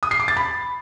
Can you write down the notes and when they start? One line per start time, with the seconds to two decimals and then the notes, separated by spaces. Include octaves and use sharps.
0.03 D#6
0.11 C7
0.20 D6
0.28 A6
0.37 B5